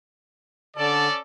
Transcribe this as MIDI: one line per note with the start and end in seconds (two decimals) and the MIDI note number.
0.77 1.07 50
0.77 1.19 61
0.77 1.19 69
0.77 1.19 74
0.77 1.07 81